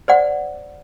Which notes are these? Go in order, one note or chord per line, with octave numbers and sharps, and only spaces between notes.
C5 D5 F#5